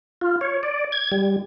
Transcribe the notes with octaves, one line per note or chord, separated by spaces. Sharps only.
F4
C#5
D5
G#6
G3